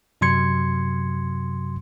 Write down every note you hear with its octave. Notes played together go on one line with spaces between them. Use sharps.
F#2 C3 F#3 C6 G#6 C#7